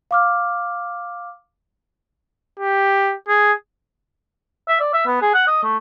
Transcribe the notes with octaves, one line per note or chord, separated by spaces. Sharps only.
F5 D6 F6
G4
G#4
E5
D5
E5
B3
G#4
F#5
D#5
A3